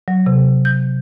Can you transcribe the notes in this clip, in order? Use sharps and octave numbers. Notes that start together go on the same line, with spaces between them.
F#3
C3
G6